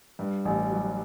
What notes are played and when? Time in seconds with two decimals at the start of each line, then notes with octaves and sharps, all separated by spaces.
0.19 G2
0.45 A1
0.71 F#3